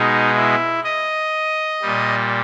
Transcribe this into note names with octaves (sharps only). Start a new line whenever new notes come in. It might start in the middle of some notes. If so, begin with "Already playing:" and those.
Already playing: B2 G#3 D#4
E4
D#5
A#2 G3